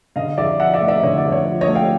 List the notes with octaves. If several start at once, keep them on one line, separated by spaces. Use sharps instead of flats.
D3 D#5 F5
F2 D5 E5
F3 E5 F#5
D5 E5
A3
D5 E5
D3 C#5 D#5
D5
F2
C#5
F3
C#5 D#5
A3
F5 G5